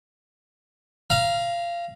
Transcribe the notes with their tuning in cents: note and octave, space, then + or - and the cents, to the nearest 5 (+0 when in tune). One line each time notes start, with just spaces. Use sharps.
F5 -20 A#5 +20